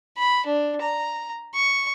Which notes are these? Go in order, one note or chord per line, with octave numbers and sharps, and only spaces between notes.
B5
D4
A#5
C#6